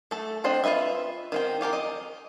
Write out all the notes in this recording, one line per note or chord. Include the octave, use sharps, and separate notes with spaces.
A3 A4
C4 D4 C5 D#5 G5
F4 A#4 B4 D#5 E5
D#3 C4 G5
F4 G4 A4 A#4
D#5